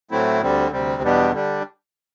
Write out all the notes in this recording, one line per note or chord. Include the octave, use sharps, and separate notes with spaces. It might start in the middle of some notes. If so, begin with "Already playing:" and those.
A2 F#3 A3 C4 E4
D2 D3 G3 C4
D2 C3 G3 C4
E2 B2 G3 B3 D4
D3 G3 D4